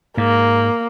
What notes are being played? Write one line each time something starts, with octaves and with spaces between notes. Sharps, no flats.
G#2 A#3